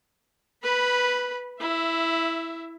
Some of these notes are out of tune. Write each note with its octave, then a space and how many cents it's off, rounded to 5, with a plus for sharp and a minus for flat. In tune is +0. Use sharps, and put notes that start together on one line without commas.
B4 +0 B5 -15
E4 +0 E5 +20